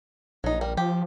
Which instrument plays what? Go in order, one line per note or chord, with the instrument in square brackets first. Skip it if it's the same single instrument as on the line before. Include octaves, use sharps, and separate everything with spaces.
[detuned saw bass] A#1 [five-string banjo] F#3 D#4
[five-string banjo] G3 A#4
[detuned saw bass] F3 [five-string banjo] G4